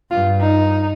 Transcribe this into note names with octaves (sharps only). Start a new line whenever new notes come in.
G2 F4
D#4